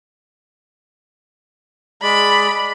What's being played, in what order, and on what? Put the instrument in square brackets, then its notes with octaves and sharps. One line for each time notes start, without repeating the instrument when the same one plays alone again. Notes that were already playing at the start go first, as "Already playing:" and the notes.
[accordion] G#3 D5 [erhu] B5